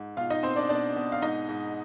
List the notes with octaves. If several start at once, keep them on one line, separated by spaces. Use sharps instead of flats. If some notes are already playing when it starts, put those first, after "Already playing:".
Already playing: G#2
B2 F4 F5
D#4 D#5
B2 C4 C5
D4 D5
B2 D4 D5
B2
F5
G#2 D#4 D#5
G#2